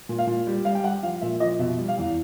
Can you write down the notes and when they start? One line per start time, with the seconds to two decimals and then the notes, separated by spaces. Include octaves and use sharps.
0.09 A#2
0.19 F5
0.27 A#2
0.47 G3
0.65 G3 F5
0.75 G5
0.84 G3 F#5
1.03 F3 F5
1.21 A#2 E5
1.40 F3 D#5
1.59 B2 E5
1.78 G3
1.88 F5
1.98 E2